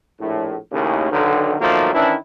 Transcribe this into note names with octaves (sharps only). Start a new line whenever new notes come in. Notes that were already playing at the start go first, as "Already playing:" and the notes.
A#1 A2
D#2 A2 C#3
B1 D3 D#3
B2 D#3 F3 F#3 A3 A#3
D#3 E3 C#4 D4 E4